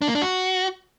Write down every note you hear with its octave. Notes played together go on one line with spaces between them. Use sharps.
D4
A#3
D4
F#4